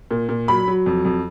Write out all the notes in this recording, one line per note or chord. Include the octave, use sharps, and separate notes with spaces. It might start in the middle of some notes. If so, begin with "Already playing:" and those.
A#2
A#2
F#3 B5
F#3
F2
F2